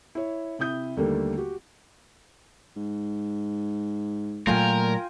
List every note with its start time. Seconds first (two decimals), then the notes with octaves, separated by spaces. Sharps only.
0.15 E4 C#5
0.59 C3 E4 D#6 G6
0.97 D#2 D3 G3 A3 A#3
1.38 F#4 G4
2.76 G#2
4.47 A#2 F#3 A3 F4 A#4 G5 G#5